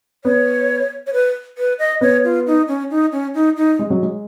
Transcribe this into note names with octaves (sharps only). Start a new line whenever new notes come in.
B3 C#5
C#5
B4
B4
D#5
B3 C#5
F4
D#4
C#4
D#4
C#4
D#4
D#4
G#3
F#3
G#3